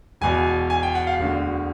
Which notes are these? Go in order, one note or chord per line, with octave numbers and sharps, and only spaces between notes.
E1 E2 B2 G#5
G#5
G5
F#5
F5
E1 D2 D3